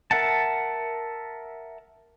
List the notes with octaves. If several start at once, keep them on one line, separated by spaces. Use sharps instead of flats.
A#4 E5 F#5 A5